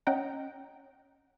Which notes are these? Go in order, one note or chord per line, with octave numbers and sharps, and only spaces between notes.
C#4 D#5 F#5 G5 A#5